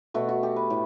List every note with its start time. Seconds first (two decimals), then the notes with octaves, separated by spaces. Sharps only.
0.14 B2 A3 F#4
0.29 F#4
0.43 G4
0.56 B4
0.70 A2